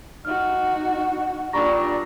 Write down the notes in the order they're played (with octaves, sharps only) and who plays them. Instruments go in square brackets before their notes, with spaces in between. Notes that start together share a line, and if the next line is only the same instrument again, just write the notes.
[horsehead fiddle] D#4 F#4 [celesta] F6
[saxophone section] A#2 G3 D4 [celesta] A#5 C#6 A#6